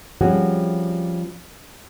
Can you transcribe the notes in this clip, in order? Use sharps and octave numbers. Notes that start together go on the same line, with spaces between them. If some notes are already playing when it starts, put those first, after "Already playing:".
F3 G3 C4 C#4 F#4 G#4